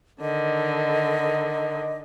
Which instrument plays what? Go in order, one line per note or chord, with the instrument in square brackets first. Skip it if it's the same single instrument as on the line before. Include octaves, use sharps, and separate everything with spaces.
[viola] D3 D#3 [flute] D#5